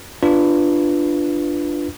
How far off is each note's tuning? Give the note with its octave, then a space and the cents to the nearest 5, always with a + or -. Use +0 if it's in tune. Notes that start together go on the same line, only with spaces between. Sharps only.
D4 +0 F4 -20 B4 +0